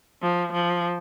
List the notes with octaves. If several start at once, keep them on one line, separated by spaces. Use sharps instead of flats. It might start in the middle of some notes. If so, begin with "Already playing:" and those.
F3
F3